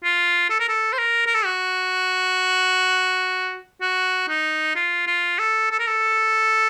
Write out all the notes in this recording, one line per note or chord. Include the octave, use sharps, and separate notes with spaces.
F4
A4
A#4
A4
C5
A#4
A#4
A4
F#4
F#4
D#4
F4
F4
A4
A4
A#4
A4